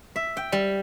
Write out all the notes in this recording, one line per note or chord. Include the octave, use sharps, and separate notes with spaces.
E5
G5
G3